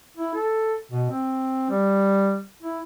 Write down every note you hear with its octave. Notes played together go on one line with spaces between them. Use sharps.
E4
A4
B2
C4
G3
E4